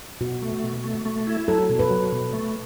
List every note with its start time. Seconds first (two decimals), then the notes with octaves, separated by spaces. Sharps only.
0.21 B2 F#4
0.42 A3
0.63 B2
0.84 A3
1.05 A3
1.27 E4
1.48 F#3 A4
1.69 B2
1.79 B4
1.90 F#3
2.12 B2
2.33 A3